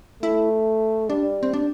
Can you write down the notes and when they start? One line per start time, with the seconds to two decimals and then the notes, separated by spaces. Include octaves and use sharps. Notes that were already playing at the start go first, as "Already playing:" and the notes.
0.22 A3 E4
1.10 G3 D4
1.43 C4
1.53 D4